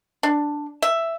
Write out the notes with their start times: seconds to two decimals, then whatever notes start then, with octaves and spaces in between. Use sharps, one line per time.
0.23 D4
0.82 E5